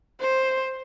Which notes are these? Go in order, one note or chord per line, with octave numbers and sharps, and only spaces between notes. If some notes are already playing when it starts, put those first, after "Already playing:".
C5